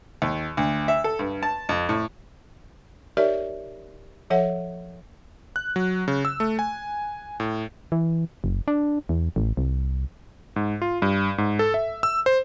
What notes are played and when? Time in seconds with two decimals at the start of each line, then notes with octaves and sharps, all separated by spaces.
0.22 D#2
0.57 D2
0.88 E5
1.04 A4
1.19 G2
1.43 A5
1.69 F2
1.89 A2
3.17 D#4 G4 A#4 C#5 D5 E5
4.30 F3 A4 C#5 E5 F#5
5.56 F#6
5.76 F#3
6.08 C#3
6.25 E6
6.40 A3
6.59 G#5
7.40 A2
7.92 E3
8.44 F#1
8.68 D4
9.09 E2
9.36 A1
9.57 C2
10.56 G#2
10.82 F4
11.02 G2
11.38 G#2
11.59 A4
11.74 E5
12.03 E6
12.26 C5